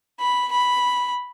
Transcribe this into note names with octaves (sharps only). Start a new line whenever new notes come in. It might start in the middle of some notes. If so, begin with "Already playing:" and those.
B5
B5